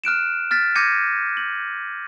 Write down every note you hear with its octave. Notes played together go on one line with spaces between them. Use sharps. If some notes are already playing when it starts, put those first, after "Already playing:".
F6 F#6 D7 E7
F6 A6 B6
D6 G6 G#6 A#6 C#7 D#7
F#7